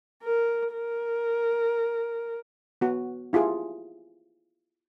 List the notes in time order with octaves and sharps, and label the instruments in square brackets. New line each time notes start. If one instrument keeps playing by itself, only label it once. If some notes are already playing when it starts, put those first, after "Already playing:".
[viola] A#4
A#4
[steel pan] B3 F#4
E4 F4 G4 G#4